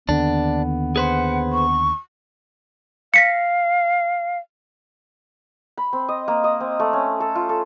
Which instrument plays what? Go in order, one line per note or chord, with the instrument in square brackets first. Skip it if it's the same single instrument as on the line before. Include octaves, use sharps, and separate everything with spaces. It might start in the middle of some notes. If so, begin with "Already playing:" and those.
[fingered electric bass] D#2 D3 [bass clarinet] B3 [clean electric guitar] D4
[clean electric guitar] G#4 B4 C5 [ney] F#5
[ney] C#6
[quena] F5 [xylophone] A#6 B6 C#7
[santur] B5
C4
D#5
A#3
D#5
C4
A3
C#4
A4
F4
A4